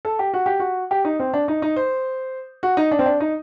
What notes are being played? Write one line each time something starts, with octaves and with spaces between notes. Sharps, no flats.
A4
G4
F#4
G4
F#4
G4
D#4
C4
D4
D#4
D#4
C5
F#4
D#4
D4
C4
D4
D#4